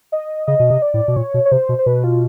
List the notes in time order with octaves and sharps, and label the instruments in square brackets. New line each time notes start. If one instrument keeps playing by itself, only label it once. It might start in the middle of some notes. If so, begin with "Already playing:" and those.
[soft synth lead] D#5
[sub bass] C#3 [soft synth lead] D#5
[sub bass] B2
C3
[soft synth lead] D5
[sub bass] A2
B2
[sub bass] A#2 [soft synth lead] C#5
[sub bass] B2
[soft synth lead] C#5
[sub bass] C3 [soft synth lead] C5
[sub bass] B2
[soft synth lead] C5
[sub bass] B2 [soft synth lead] B4
[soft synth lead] F4